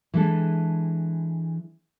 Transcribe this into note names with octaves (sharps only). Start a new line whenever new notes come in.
E3 G#3 D4 E4 A4